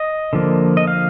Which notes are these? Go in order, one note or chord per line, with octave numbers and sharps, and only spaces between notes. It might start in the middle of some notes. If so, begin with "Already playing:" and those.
Already playing: D#5
D3 F3 A#3
D#5
F5